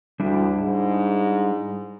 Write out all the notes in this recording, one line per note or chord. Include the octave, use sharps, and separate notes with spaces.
D2 G3 D4 E4
G#2